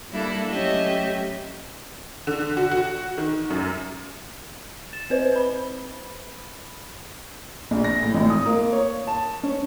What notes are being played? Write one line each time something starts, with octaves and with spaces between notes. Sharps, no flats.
G3 A#3 D4 E4 A4
F#3 A3 C#4 G4 D#5 E5
D3
F#4
F#4
D#3
F#2
A6 E7
C4 B4 C5
B5
A#1
A#6
A2
G#1
D#6
A#3
C#5
A5
C#4